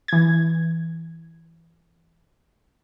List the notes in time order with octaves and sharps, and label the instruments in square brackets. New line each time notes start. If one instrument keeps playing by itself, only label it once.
[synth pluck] E3 G#6